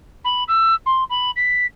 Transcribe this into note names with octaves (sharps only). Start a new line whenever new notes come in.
B5
E6
C6
B5
B6